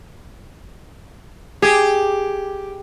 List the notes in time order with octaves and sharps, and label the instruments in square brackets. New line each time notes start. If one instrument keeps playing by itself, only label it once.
[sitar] G4 [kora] G#4